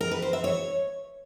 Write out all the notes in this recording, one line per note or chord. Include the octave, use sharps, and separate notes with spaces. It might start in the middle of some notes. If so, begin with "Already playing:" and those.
A#4
B4
C5
E5
C#5